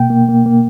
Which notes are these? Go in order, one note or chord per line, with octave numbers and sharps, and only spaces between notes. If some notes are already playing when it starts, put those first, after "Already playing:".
Already playing: B2 A#3 G5
A#3
A#3
A#3